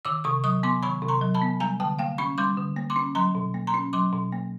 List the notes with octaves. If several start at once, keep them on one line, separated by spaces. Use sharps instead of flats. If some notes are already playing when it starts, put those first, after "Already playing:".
D#3 D6 E6
C3 C#6 D#6
F#3 C#6 D#6
B3 C6 D6
D#3 B5 C#6
C3
A#5 C6
F#3
A5 B5
B3
G3 G#5 A#5
D3 G5 A5
A#3 F5 G5
C#4 B5 C#6
G3 C6 D6
D3
A#3
C6 D6
C#4
F#3 A#5 C6
B2
A#3
A#5 C6
C#4
F#3 C6 D6
B2
A#3